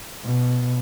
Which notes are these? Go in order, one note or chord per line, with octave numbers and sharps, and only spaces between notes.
B2